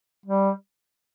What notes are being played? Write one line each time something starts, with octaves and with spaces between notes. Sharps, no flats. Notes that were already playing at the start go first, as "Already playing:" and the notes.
G3